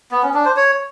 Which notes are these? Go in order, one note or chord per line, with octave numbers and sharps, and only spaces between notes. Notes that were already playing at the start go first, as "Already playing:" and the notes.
B3
C#4
D4
C5
C#5